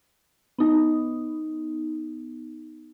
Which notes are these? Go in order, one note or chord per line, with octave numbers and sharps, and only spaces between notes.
B3 D#4